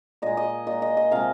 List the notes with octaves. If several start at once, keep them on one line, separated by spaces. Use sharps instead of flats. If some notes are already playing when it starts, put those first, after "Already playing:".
A#2 G#3 D#5
D#5
A#2 G#3 D#5
D#5
D#5
C3 F3 G#3 F5